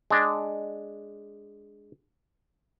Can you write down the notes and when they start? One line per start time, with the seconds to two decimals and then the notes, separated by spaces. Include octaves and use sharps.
0.11 G#3 D4